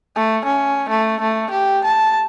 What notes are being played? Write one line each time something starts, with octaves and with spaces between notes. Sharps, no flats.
A3
C#4
A3
A3
G4
A5